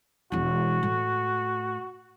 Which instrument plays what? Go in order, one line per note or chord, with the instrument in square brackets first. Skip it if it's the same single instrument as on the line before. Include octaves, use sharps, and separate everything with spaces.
[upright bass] E1 E3 [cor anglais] F#4
[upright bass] A2